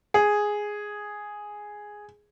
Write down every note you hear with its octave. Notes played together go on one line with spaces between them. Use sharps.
G#4